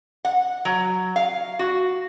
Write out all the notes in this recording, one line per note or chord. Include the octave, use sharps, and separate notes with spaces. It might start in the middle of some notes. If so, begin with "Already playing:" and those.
F#5
F#3
F5
F#4